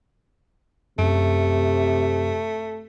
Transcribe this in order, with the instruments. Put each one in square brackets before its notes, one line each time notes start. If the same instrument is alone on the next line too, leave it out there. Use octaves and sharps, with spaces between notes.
[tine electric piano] F#2 [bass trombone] C3 [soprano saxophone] A3